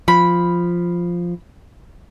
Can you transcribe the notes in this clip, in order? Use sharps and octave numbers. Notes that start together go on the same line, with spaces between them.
F3 B5